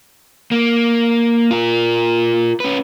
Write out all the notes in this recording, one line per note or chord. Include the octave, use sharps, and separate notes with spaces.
A#3
F4 A#4
C#4 B4